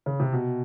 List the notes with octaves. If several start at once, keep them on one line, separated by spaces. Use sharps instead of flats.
C#3
C3
B2